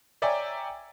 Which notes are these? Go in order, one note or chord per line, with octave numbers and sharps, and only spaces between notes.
C#5 D5 E5 G5 G#5 A#5